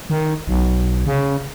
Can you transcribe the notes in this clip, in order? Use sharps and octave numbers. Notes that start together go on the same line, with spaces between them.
D#3
B1
C#3